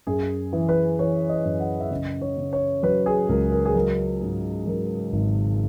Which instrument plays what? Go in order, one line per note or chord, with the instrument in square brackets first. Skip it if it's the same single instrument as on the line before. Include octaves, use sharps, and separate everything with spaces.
[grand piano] F#2 G#4
E3
B4
E3 C#5
D#5
F#2
F#5
E5
C#3 D#5
C#5
C#3
C#5
F#3 B4
G#4
C#2 A#4
A#4
G#4
F#3 A#4
G#2
F#3 A#4
G#1